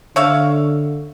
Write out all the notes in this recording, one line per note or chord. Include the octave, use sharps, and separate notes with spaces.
D3 C#5 E5 F5